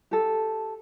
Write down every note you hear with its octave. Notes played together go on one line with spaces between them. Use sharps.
G4 A4